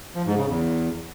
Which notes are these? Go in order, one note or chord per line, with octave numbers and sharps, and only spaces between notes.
F3
G#2
C#3
E2